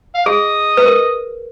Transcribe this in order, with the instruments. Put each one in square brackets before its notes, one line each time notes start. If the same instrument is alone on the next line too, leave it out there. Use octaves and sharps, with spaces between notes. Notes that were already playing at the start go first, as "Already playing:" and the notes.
[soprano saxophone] F5
[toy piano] G#4 [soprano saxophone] D#5
[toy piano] B4
A#4